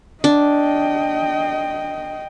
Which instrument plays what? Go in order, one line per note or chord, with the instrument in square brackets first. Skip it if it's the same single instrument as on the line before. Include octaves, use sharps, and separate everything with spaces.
[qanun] D4 [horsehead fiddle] D#5 G5